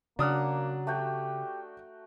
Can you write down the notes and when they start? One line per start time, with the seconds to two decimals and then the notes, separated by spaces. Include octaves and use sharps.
0.19 C#3 F#3 A#3 D4 F#5 D#6 F6
0.87 A3 F#4 G4 G5